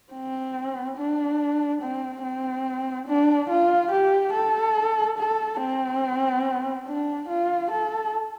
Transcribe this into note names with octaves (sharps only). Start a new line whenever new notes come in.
C4
D4
C4
C4
D4
F4
G4
A4
A4
C4
D4
F4
A4